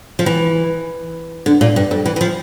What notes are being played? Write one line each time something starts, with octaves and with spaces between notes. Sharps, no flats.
F3
E3
D3
A#2
G2
F2
E3
E3
F3